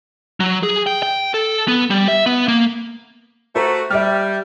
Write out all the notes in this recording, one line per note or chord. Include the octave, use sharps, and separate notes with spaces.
F#3
G#4
G5
G5
A4
B3
G3
E5
B3
A#3
A3 F#4 C5 A#5
G3 E5 F6